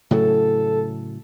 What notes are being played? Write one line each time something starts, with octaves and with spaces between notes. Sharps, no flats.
A2 C#3 F#3 A4